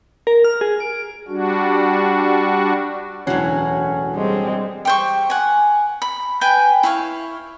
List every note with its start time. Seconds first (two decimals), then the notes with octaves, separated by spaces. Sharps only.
0.27 A#4
0.44 F6
0.61 G#4
0.80 D7
1.28 G3 D4 F#4
3.27 E1 D2 A2 E3 F#3 C#4
4.13 G3 G#3 C4
4.85 G4 C5 C#6
5.30 F#5 G#5
6.02 B5
6.41 B4 G5 G#5
6.83 E4 C#5 F5